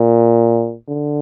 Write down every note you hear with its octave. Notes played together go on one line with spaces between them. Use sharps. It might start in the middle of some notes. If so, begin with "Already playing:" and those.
Already playing: A#2
D3